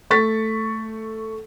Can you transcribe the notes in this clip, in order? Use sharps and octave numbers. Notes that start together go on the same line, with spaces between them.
A3 C#6 A6 B6